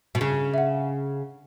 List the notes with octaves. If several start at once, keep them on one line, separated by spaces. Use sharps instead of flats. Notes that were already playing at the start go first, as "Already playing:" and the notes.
B2
C#3
E5
F#5